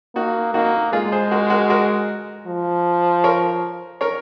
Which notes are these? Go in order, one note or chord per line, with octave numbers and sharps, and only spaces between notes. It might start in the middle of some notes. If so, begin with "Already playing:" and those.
A#3 D#4 F#4
A#3 D#4 F#4
G#3 F4 G#4
G#4 C5
F#4 A#4
F#4 A#4
F#4 A#4
F3
A#4 C#5
A#4 C#5